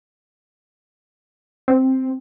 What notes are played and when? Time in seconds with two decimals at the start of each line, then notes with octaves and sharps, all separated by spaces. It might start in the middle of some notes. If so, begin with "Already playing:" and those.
1.68 C4